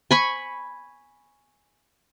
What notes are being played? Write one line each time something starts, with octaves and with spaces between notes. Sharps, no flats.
G#5 B5 C#6